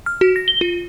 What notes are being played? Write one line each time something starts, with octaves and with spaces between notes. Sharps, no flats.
F6
F#4
A#6
G7
F4